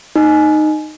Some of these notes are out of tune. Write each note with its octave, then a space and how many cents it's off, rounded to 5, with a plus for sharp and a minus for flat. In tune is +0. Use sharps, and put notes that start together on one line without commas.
D#4 -15